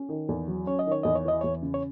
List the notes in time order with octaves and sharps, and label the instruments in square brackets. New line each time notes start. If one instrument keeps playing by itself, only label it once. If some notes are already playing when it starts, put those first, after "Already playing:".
Already playing: [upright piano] C#4
D#3
E2
F#3
[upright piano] C#4 [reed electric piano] C#5
[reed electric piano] D#5
[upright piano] D#3
[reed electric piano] C#5
[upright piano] E2 [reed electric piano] D#5
[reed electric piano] C#5
[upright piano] E3 [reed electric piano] D#5
[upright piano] E2 [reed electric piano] C#5
[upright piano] C#3
[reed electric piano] C#5